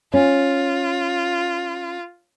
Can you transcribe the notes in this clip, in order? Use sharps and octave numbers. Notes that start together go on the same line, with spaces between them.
C#4 F4